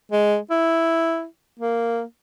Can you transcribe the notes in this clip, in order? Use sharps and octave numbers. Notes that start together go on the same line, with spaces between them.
G#3
E4
A#3